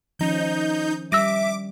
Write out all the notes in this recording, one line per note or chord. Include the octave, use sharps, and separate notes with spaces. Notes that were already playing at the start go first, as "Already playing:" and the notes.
D#3 F3 C#4 D#4 G6
G3 E5 D6 E6 A#6 D#7